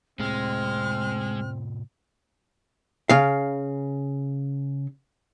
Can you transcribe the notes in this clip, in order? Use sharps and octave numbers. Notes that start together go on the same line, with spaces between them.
A2 C3 G#3 C4 F6
C#3 F5